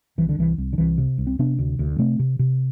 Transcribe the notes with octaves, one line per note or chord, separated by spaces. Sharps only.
C2 E3
D3
C2 E3
C2
D3
C2 E3
C3
C2
C4
C3 B3 D4
D2
D2
C3 A3 C4
C3
C3